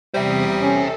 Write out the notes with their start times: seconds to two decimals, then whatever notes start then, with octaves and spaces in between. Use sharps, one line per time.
0.14 E2 C3 G3 C5 E5 D#6
0.61 C#4 A4